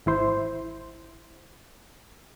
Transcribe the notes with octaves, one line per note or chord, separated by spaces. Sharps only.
G#1 E4 C5